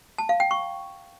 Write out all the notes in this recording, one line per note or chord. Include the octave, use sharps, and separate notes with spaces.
A5
F5
G5
C#6